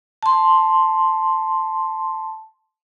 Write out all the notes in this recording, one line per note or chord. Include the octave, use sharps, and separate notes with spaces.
A5 C6